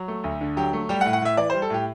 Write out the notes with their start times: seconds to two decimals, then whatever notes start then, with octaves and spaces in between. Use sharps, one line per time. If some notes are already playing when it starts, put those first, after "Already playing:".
Already playing: F#3
0.08 A3
0.24 D2
0.41 D3
0.57 F#3 G4
0.73 A3
0.89 G3 G4
1.01 F#5
1.06 A2
1.13 F#5
1.22 A2 E5
1.37 E3 D5
1.50 C5
1.54 G3
1.62 A4
1.70 A2 G4